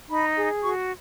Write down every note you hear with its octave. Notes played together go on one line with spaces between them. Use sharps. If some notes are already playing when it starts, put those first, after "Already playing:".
D#4 B5
G#4
F#4 C#6